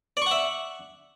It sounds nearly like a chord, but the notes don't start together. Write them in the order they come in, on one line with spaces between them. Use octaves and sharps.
D5 C#6 F#5 E5